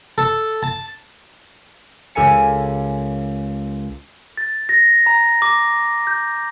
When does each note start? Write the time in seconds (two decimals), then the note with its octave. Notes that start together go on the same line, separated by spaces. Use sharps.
0.18 A4
0.63 A5
2.15 C#2 G4 A4 A#4 G#5 C#7
4.37 A6
4.69 A#6
5.06 A#5
5.42 D6
6.07 G6